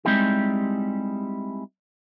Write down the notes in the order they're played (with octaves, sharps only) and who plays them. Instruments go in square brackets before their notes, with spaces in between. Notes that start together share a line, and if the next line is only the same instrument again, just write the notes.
[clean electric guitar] G3 G#3 C4 D#4 E4 G4